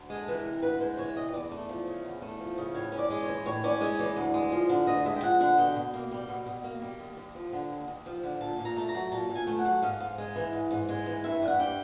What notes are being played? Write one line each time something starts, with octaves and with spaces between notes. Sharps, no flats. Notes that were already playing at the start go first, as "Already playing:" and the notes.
Already playing: D2
G#3
A4
E3 B4
A#4
C3
D2 B4
G#3 C5
E3 C#5
C3 D#5
E2 D5
A3
F3
C#3
E2
A3
F3
C#3
A2 C#5
C#4 C#5
D5
G#3
C#5
E3
A2 C#5
C#4 D5
G#3 C#5
E3 D5
D2
G#3
F3
D3
D2 D#5
G#3 E5
G5
F3 F#5
D3 F#5
B2 G5
B2
A#3
G3
B2
B2
A#3
G3
D#2
D#2
F3
D3
D#2
D#2
F3
D3
A#2 A5
A#2
A#5
A3 A5
A#5
F#3
A#2 A5
A#2
G#5
A3
F#5
F#3
G#2 F5
G#2
G#3
E3
G#2
G#2
G#3
E3
G2 E5
G2
F#5
G3 G5